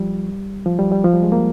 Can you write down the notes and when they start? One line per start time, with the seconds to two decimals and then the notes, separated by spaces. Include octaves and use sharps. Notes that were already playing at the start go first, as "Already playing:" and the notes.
Already playing: F3 G3
0.66 F3
0.79 G3
0.92 G3
1.04 F3
1.14 G3
1.23 G#3
1.32 A#3